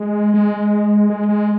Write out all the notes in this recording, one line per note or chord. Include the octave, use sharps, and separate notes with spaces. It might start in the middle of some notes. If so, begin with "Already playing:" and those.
Already playing: G#3
G#3
G#3
G#3